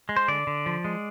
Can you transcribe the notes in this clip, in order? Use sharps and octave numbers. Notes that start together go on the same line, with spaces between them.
G#3
C5
D3 D5
D3
F3
G#3